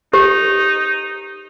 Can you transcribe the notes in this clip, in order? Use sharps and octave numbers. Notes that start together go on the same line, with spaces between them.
D#4 G4 C5